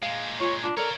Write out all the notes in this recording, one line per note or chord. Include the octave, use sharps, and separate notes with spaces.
A#2 G#3 F5
F4 C#5 G#5
D4 F4
A4 A#4 C#5 D5 F5